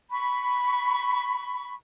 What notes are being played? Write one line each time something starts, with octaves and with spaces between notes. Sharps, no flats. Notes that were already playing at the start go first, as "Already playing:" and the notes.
B5 C#6